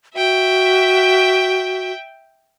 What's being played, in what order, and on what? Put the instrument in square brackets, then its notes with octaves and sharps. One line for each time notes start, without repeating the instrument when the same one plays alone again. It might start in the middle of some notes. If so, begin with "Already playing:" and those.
[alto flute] F#4 [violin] E5 G5